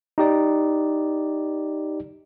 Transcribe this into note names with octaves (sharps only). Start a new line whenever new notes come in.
D#4 G4 D5